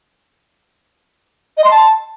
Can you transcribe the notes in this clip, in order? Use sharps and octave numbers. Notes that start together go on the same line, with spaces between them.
D#5
C6
A5